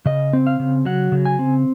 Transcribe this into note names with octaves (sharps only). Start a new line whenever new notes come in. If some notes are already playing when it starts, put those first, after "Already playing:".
C#3 D#5
C4
F5
C#3
F#3 F#5
C#3
G#5
C4